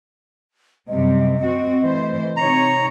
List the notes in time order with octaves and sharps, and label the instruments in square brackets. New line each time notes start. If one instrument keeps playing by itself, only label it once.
[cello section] F#2 C3 G3 [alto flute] D#5
[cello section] C4 F#4
E3 A3 C5
[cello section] C3 D#4 C#5 [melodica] A#5